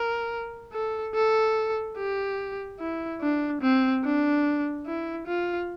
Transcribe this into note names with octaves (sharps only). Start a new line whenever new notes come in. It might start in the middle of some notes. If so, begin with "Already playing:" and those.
Already playing: A#4
A4
A4
G4
E4
D4
C4
D4
E4
F4